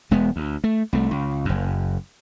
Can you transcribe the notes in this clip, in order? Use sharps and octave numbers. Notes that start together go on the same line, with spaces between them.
E1 G#3 B3
D2
A3
C2 A3
C#2
F#1 F#2